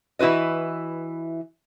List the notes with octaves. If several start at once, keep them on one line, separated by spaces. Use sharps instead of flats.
E3 E4 F#4 B4 D#5